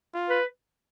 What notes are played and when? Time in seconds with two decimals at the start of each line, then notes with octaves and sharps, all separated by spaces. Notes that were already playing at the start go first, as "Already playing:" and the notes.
0.14 F4
0.30 B4